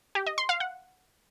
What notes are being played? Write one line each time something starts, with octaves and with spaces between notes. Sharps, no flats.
G4
D#5
C6
F5
F#5